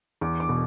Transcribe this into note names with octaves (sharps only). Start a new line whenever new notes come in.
E2 D6
D6
B2